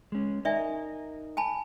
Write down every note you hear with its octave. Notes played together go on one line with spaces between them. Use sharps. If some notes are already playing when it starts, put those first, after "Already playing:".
G#3 C#4
D#4 A#4 D5 E5 G#5
G#5 A5 B5